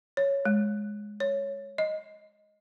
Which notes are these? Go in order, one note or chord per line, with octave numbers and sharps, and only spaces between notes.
C#5
G#3
C#5
D#5